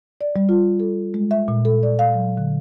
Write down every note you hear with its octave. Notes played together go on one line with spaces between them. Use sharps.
D5
G3
F4
A4
G#3
E5
A#2
A4
D5
F5
F#3
D3